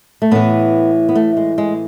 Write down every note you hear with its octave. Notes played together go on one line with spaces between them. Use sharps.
A3
A2 E3 B3
B3
A3
G#3
G#3